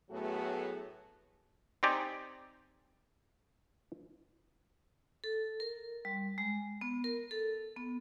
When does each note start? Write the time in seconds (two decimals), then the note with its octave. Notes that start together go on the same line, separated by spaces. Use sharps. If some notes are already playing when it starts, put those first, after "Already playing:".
0.10 A2 F#3 A3 B3 F#4 G#4
1.83 C4 D#4 G4 D5 G#5
5.24 A4
5.60 A#4
6.05 G3
6.38 G#3
6.81 B3
7.04 A#4
7.31 A4
7.77 B3